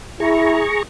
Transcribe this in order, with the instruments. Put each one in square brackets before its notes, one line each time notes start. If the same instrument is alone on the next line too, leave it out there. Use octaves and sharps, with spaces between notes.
[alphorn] E4 [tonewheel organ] G#4 A#5 C#6